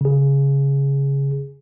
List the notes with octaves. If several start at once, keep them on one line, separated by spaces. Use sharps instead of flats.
C#3 G#4